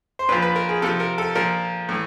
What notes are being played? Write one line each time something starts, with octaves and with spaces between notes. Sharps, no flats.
C5
A#2 F3 B4
B4
A#4
G#4
C3 F3 A4
A#4
A4
A#2 F3 A#4
A2 E3